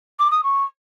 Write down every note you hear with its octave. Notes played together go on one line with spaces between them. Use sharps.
D6
D#6
C#6